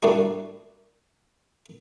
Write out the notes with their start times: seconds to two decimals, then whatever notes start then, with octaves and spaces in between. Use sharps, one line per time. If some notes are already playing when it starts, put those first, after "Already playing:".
0.03 A#2 G3 A#3 D4 E4 F#4